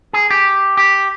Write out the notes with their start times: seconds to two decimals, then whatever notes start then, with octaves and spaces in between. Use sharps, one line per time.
0.13 G#4
0.30 G4
0.77 G4